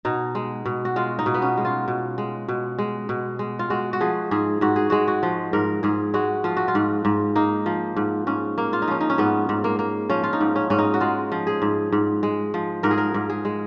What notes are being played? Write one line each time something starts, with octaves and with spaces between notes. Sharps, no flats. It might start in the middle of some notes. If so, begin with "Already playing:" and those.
B2 D#4
G#3
B2
F#4
G#3 F4
D#4
B2
B3
C#4
G#3
F4
B2
G#3
B2
G#3
B2
G#3
F4
G#3 F#4
F#4
F3 G#4
G#2 G#4
G#2 F#4
G#4
G#3 F#4
F#4
F3
G#2 A#4
G#2 G#4
G#3 F#4
F3 F4
F#4
F4
G#2
G#2
A#3 D#4
F3
G#2
G#2 C#4
A#3
F4
D#4
F3 C#4
D#4
C#4
G#2 B3
G#2
A#3
A#3
F3 C#4
F4
D#4
G#2
C#4
G#2 C#4
D#4
F#4
G#3 F4
F3
G#4
G#2
G#2
G#3
F3
G#2 A#4
G#4
A#4
G#2
G#4
G#3